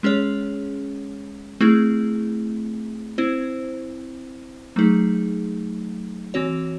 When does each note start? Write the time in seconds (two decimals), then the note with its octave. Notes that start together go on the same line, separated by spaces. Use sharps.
0.03 G#3 C#4 G#4 C#5
1.61 A3 C4 E4 G#4
3.18 C4 E4 C5
4.76 F#3 A3 D#4 G#4
6.34 E3 C4 F#4 C#5